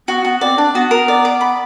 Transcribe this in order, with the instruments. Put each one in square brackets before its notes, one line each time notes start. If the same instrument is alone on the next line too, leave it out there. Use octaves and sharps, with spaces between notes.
[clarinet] B3 [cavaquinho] F#4
[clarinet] B3 [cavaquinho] F#4
[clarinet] C4 [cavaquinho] D5
[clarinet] D4 [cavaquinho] D5
[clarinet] B3 [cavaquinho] F#4
[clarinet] B3 [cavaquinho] A#4
[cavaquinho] D5
D5
B5